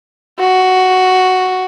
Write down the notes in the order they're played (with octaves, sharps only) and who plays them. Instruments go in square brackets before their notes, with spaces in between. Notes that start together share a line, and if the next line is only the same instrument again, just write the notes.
[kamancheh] F#4